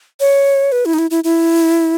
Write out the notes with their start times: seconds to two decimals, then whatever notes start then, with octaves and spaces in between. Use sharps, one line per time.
0.20 C#5
0.72 B4
0.85 E4
0.93 D#4
0.98 E4
1.11 E4
1.24 E4